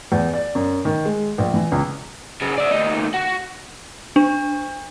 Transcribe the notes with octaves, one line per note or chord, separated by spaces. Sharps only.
E2
D5
F#2
D#3
G#3
A#1
E3
C#2
F#2 C#3
D5 E5
D2 D#4
F#4
D4